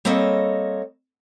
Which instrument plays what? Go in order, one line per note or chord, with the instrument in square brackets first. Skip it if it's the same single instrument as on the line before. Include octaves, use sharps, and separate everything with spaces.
[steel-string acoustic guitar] G3 A#3 C4 A4 C#5 D#5